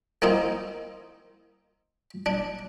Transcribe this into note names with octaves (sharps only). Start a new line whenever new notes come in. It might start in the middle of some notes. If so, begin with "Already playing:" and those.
A#3 C4 D#4 E4
D4